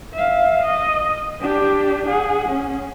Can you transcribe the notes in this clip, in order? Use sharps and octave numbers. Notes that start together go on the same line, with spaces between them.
E5 F5
D#5
D4 G4
G#4 F#5
C#4